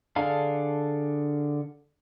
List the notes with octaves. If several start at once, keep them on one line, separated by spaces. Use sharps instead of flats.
D3 D4 G#4 A4 F5